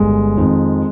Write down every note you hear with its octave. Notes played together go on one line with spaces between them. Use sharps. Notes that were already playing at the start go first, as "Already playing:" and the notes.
Already playing: G1 G#3
F2 D#3